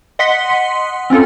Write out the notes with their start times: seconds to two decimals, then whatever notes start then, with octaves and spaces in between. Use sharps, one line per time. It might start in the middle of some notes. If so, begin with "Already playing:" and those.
0.19 D#5 F#5 C6 B6 C#7 G7
1.10 C4 C#4 F4 A4